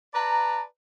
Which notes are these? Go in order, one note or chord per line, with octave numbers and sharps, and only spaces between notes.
B4 D5 A5 A#5